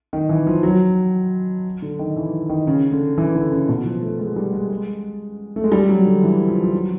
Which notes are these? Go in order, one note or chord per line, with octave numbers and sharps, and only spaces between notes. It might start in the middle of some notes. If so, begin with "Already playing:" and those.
D#3
E3
F3
F#3
D3
D#3
E3
D#3
C#3
D3
E3
D3
C#3
B2
F3
A3
G#3
G3
G#3
G#3
A3
G#3
G3
F#3
D3
E3
F3
F3
F#3